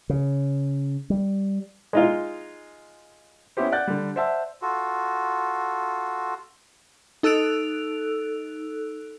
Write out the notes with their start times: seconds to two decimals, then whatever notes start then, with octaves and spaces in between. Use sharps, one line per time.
0.10 C#3
1.10 G3
1.93 G#3 D#4 F4
3.57 B3 C#4 E4 G4 C5
3.72 D5 F#5 F#6 G6 A6
3.87 D3 G3
4.16 C5 D5 E5 F#5 A5 E6
4.62 F4 F#4 A4
7.23 D#4 A4 E6 F#6 D7 F7